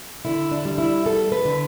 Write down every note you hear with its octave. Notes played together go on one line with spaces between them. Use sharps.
D3 E4
D4
G3
E4
B3 A4
B4
D3